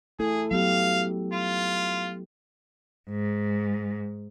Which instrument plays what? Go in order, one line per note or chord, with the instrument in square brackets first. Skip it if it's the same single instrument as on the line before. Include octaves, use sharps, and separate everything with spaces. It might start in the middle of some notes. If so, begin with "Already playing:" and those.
[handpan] A3 E4 A4 [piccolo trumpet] G#4
[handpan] F#3 B3 G4 [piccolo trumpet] F5
[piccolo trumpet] F4
[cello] G#2